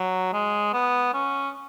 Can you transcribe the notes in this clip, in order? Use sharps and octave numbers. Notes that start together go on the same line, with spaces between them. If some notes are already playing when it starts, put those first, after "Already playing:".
Already playing: F#3
G#3
B3
C#4